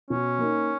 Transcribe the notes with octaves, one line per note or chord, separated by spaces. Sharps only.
B2 C#4
A#3 D#4